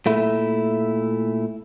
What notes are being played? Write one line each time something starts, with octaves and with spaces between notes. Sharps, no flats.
A#2 A3 E4